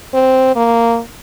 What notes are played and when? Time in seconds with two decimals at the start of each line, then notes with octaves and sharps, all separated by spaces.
0.14 C4
0.56 A#3